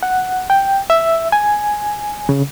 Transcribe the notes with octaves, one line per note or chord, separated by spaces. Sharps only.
F#5
G5
E5
G#5
C#3